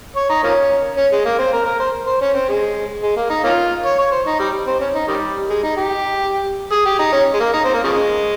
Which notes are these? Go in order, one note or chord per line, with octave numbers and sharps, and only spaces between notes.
C#5
D#4
F3 A#3 C#4
C#4
G#3
A#3
C4
A#4
A#4
C5
C5
C#4
C4
G#3
G#3
A#3
D#4
A#3 C#4 F4
C#5
C#5
C5
D#4
G3
C4
C#4
D#4
D#3 G3
G#3
D#4
G4
G#4
G4
D#4
C#4
G#3
A#3
D#4
C4
A#3
C#3 F3 G#3